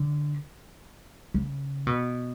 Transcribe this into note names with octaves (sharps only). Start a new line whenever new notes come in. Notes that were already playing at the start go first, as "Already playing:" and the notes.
Already playing: D3
C#3
B2